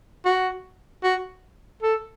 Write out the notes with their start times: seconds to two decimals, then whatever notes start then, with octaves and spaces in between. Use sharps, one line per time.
0.25 F#4
1.04 F#4
1.83 A4